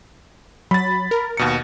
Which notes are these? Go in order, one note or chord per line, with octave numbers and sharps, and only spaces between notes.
F#3 B5 A6
A#4
D#2 B2 C#7